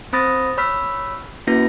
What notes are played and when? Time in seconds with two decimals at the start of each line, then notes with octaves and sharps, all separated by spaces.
0.13 C4 C5 B5 D#6 A6 A#6
0.58 C#5 B5 E6 F6 B6
1.47 A#3 C#4 E4 F#4 B4 A#6